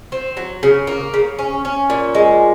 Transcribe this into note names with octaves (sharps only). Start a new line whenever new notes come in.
C4
F#3
C#3
A#3
C#3
C#4
C#4
A#2
G#3